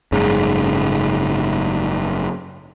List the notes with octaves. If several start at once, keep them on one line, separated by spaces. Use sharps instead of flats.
F#1 G#2 C#3